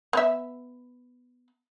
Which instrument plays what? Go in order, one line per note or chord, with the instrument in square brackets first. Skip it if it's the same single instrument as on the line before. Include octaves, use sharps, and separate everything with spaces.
[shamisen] B3 E5